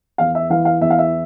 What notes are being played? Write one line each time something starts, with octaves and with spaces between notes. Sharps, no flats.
E2 F5
E5
E3 F5
F5
E2 E5
F5
E5